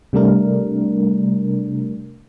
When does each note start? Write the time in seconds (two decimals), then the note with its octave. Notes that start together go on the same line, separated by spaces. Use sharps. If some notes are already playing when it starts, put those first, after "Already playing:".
0.13 C3 G3 A3 D4 A#4